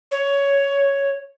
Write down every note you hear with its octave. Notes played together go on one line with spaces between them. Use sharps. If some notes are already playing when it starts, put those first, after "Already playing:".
C#5